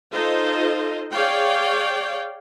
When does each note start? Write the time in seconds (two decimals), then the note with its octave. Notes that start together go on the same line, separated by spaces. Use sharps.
0.13 D#4 F4 A4 C5 D#5
1.12 G#4 C#5 D5 F5 G5